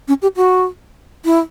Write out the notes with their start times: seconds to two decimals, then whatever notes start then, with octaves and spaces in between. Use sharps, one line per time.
0.08 C#4
0.22 G4
0.36 F#4
1.25 E4